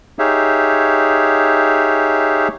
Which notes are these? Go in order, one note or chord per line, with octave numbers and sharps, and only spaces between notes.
D#4 G4 G#4 C#5 E5 F5